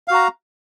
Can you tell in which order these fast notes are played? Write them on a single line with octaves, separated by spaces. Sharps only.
F5 F#4 A#5